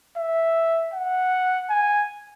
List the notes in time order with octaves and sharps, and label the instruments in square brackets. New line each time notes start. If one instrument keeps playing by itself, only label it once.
[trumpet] E5
F#5
G#5